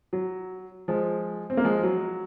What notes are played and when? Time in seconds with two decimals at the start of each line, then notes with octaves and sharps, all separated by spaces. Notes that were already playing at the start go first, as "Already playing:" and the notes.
0.13 F#3
0.88 F3 G#3
1.50 C4
1.57 A#3
1.64 F3 G#3
1.79 F3
1.83 F#3